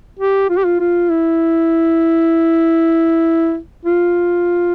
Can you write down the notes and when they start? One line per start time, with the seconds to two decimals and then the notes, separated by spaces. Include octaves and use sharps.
0.19 G4
0.50 F4
0.58 G4
0.65 F4
0.80 F4
1.11 E4
3.86 F4